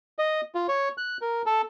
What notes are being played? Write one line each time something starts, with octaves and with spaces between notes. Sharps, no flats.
D#5
F4
C#5
F#6
A#4
A4